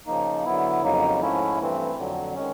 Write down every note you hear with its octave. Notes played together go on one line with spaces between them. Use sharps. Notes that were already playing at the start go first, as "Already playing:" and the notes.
C#3 F3 A#3 D#4
D3 F#3 B3 E4
F2 C#3 F#3 A#3 D#4
G#2 F3 A3 C#4 E4
G2 E3 A3 C4
F2 D3 F#3
D#3 G#3 C#4